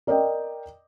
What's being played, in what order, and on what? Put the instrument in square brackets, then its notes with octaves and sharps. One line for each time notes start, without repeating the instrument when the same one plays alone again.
[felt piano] A#4 D5 D#5 G5